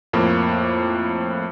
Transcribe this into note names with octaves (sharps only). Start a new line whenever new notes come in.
F2 A2 A#3